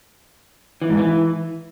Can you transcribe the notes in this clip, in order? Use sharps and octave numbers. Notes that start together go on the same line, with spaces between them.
E3
G#2
E3